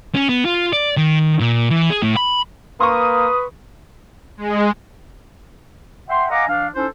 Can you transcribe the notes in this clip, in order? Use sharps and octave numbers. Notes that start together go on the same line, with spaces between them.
C#4
B3
F4
D5
D#3
A#2
E3
G#4
A2
B5
A#3 B4 C6 C#6 D#6
G#3
E5 F#5 G5 C6
D#5 F5 F#5 G#5 A#5 D6
E3 D4 F5
C#4 D#4 E4 A4 C5